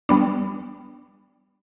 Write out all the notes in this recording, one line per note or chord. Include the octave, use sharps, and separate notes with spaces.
G3 B3 D4